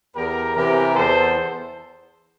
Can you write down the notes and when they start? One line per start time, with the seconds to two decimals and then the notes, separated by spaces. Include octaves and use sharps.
0.15 E2 G4 A#4
0.55 C3 E3 G4 A#4
0.94 E2 A4 C5